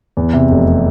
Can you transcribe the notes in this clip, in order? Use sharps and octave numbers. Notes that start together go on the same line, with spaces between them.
E2
C3
F1